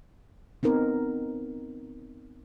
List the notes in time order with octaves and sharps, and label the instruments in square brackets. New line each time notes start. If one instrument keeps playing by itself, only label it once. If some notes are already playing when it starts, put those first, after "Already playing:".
[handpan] B3 C4 D#4 A#4